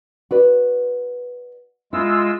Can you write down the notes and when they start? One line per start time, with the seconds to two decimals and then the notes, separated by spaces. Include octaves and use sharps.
0.31 F#4 B4 D5
1.93 G#3 E4 F4 E6